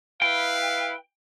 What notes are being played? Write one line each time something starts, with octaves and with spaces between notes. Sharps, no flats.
E4 B4 F5 G5